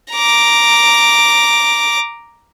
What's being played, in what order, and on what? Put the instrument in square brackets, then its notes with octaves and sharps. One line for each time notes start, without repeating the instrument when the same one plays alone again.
[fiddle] A#5 D6